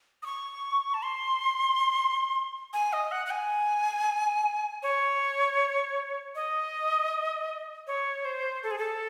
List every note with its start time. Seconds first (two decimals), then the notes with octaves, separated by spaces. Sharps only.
0.23 D#6
0.26 C#6
0.94 A5
1.03 C6
2.73 G#5
2.93 D#5
3.12 F#5
3.26 F#5
3.31 G#5
4.83 C#5
6.35 D#5
7.87 C#5
8.25 C5
8.63 A4
8.71 G#4
8.78 A4